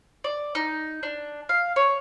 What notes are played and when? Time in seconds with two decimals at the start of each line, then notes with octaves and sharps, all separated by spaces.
0.24 D5
0.55 D#4
1.03 D4
1.49 F5
1.76 C#5